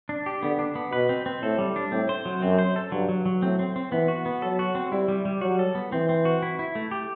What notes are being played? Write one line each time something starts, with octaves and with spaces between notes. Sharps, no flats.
D4
G4
D3 B3
D4
B3
B2 B4
C4
C4
A2 A4
G3
D4
A2 C4
C5
F#3
F#2 C4
C5
A4
G2 F#3
F#3
F#3
A2 C4
C4
C4
E3 B3
F#4
B3
F#3 A4
F#4
C4
G3 E4
G3
G3
F#3 F#4
A4
B3
E3 C4
C4
F#4
E4
E4
A3
G4